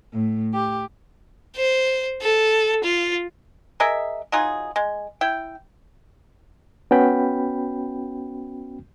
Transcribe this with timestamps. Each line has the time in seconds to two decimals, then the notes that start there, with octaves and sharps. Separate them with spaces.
0.13 A2
0.54 G4
1.56 C5
2.21 A4
2.83 F4
3.80 G#4 A#4 D#5 E5
4.32 F#3 D#4 F4 G#4
4.76 G#3
5.21 E4 G5
6.91 B3 C#4 F#4 G5 B5